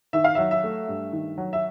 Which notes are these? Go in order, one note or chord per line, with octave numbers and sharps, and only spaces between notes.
D#3 E5
F5
F#3 E5
E5
A3
G2
D#3
F#3
E5